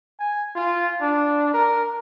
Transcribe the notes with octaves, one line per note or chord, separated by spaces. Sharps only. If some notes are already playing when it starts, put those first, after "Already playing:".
G#5
F4
D4
A#4